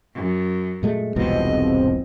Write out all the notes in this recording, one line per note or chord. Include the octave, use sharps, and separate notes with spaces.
F#2
A#2 G#3 A3
E1 C2 G#2 B2 F3 C4 D#5